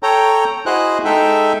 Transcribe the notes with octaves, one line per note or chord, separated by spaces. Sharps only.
A4 C#5 G5 A#5
E4 F#4 G#4 C5 D#5 F#6
G#3 D#4 A4 E5 G5